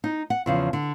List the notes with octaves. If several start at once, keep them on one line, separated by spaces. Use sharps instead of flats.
D#4
F#5
E2 C#3 F3
D3